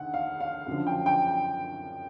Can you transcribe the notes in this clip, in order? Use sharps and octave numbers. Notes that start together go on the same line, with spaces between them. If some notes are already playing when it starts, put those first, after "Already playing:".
Already playing: D2 D#3 F#5
F5
F5
F#2 D3 F3
G5
G5